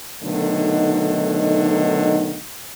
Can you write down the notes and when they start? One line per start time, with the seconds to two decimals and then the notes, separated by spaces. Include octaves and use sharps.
0.24 B2 D3 D#3 F#3 A3 D#4